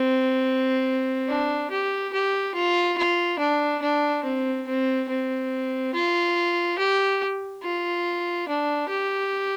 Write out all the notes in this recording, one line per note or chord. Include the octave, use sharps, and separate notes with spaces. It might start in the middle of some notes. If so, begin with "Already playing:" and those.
Already playing: C4
D4
G4
G4
F4
F4
D4
D4
C4
C4
C4
F4
G4
F4
D4
G4